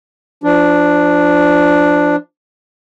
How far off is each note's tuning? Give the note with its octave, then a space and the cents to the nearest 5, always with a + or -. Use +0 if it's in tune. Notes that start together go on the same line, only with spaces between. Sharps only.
F3 -25 D4 +0